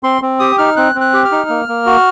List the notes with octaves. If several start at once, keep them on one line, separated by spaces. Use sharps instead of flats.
C4 C6
C4
G4 D#6
D#4 F6
C4 F#6
C4
F#6
G4
F6
D#4
A#3
A#3
F#4